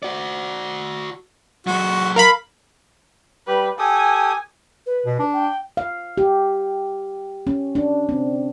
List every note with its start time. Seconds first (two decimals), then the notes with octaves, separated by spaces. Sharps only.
0.03 F#4 D5
1.67 F#3 G#3 F#4
2.16 A#4 F5 B5
3.47 G3 G4 B4
3.79 G4 A4 G#5 D#6
4.86 B4
5.06 B2
5.19 D4
5.33 G5
5.77 F5
6.18 G4
7.47 C#4
7.75 D4
8.09 C4